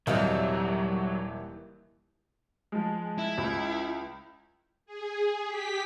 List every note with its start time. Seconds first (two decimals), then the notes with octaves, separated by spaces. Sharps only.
0.07 D#1 D#2 C3 D#3 E3 F#3 G3 F5
2.72 F3 G#3
3.18 E4
3.38 C#2
4.86 G#4
5.47 G4 B6